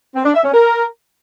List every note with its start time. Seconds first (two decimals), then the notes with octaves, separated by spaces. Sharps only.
0.15 C4
0.25 D4
0.34 E5
0.44 C#4
0.54 A#4